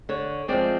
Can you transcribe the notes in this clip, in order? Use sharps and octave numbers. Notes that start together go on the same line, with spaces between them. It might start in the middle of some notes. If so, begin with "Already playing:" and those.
D3 C#5
F3 G#3 C4 D5